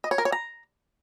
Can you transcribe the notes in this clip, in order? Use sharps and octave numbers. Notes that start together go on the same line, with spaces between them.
D#5
C#5
A#4
C#5
A#5